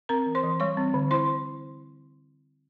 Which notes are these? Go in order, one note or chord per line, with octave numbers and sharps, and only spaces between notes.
C4 A#4 A#5
E3
C5 C6
E3
G3 C#5 C#6
C4
D3
E4 C5 C6